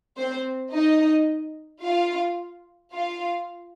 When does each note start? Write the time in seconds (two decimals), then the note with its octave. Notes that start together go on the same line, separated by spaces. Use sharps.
0.18 C4 C5
0.73 D#4 D#5
1.83 F4 F5
2.92 F4 F5